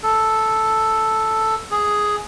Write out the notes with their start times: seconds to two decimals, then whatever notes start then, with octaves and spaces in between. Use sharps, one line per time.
0.03 A4
1.71 G#4